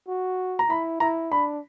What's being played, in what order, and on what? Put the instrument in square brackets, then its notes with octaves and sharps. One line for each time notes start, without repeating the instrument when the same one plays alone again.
[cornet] F#4
[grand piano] A#5
[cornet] E4 [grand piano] B5
[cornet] E4 [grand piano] A#5
[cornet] D4 [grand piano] B5